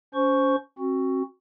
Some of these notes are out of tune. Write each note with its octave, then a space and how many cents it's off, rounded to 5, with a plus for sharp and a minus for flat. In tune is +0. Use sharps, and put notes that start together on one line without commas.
C#4 +25 C5 +0 C#6 +0
C4 +35 F#4 +5